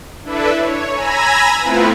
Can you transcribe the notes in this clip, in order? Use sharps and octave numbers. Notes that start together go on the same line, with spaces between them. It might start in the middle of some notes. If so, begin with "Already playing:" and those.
D4 E4 A4 B4 E5
C#5
G#5 A#5 B5 E6 G#6 A#6
A3 B3 C4 E4 F4 B4